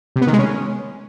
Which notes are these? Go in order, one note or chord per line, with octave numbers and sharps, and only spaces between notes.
C3
B3
D#3
G#3
C#4